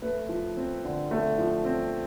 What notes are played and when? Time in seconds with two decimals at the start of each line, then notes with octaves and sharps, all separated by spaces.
0.02 A3 B4
0.29 F3
0.57 C4
0.85 D3
1.11 A3
1.38 F3
1.65 C4